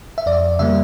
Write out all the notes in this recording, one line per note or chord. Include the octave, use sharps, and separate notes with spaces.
E5
F2 D5
C#3 G3 A#3 E5